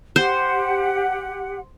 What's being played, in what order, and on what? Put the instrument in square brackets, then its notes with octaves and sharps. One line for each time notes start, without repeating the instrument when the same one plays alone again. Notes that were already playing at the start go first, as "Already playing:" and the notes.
[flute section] G4 F#5 [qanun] C5